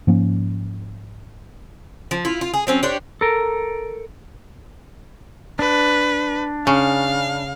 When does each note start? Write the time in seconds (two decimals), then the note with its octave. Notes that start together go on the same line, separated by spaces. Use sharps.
0.07 G#2 F3 A#3 C#4
2.11 F3
2.25 E4 F4
2.41 F4
2.54 G#4
2.67 F#3 C4 C#4
2.83 D4 G4 C5 C#5
3.21 A4 A#4
5.59 D4 B4
6.67 C#3 F5